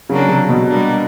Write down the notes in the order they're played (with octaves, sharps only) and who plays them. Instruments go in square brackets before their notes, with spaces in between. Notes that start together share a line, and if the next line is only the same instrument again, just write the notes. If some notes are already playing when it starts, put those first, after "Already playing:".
[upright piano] C#3 [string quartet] F#3 A#3 D4
[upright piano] C3
B2
[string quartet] G3 A#3 D4